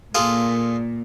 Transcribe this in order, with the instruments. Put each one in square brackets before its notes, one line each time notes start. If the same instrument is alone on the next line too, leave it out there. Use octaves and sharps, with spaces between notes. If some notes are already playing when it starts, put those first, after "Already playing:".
[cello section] A#2 [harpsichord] F4 G#4 A4